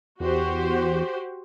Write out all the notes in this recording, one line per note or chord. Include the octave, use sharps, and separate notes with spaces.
E2 F#4 G4 C5